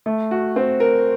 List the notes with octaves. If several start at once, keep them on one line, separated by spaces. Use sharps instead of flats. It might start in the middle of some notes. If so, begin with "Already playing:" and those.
A3
F#4
C4
A#4